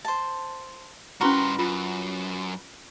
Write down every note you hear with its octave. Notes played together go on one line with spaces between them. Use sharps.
C5 A5
G2 C#4 E4 F#4 A#4 B4 A#5 C6
F#2 F4